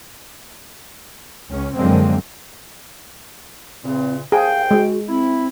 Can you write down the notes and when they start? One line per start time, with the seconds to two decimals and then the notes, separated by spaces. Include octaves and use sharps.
1.48 C#2 C#4
1.77 F#2 D3 F3 G#3 A#3 C4
3.84 E2 A#2 C#3 C4
4.32 C2 G#4 C5 F5 G5
4.71 G#3 F#4
5.08 C4 E4